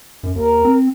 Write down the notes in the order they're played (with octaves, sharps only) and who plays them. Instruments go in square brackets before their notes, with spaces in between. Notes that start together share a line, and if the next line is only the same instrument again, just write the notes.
[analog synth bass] F#2
[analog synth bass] D#2 [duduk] A#4
[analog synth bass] C4